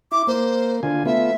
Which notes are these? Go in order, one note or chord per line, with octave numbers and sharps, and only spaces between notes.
E4 D6
A#3 C5
D3 F4 G#5
A3 B3 F4 E5